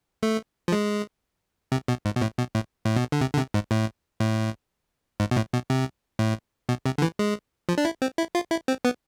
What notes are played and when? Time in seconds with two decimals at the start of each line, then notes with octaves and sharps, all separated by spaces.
0.23 A3
0.68 F3
0.72 G#3
1.72 C3
1.88 B2
2.05 G#2
2.16 B2
2.22 A2
2.38 B2
2.55 A2
2.85 A2
2.96 B2
3.12 D3
3.21 C3
3.34 D3
3.37 C3
3.54 G#2
3.71 A2
4.20 A2
5.20 G#2
5.31 B2
5.36 A2
5.53 B2
5.70 C3
6.19 A2
6.69 B2
6.86 C3
6.98 D3
7.02 E3
7.19 G#3
7.69 F3
7.78 D4
7.85 E4
8.02 C4
8.18 E4
8.35 F4
8.51 E4
8.68 C4
8.85 B3